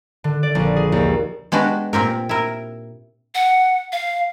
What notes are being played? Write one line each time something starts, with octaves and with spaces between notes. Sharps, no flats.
D3
D5
A#1
G#4
D#2
G#3 B3 D4 F#4 G4
A#2 C4 G4 A#4
E4 A#4
F#5
F5